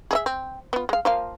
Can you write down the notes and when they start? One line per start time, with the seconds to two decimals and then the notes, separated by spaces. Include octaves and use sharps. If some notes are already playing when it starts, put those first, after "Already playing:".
0.11 G#4 D#5 E5
0.26 C4
0.73 B3 F4
0.89 G#3 F5
1.05 F3 A#3 F5